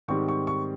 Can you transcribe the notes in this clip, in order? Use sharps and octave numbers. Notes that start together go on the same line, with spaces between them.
G#2 D#3 G3 C4 C#6
C#6
C#6